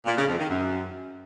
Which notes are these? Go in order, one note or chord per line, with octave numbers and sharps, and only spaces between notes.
A#2
C#3
F2
D#3
F#2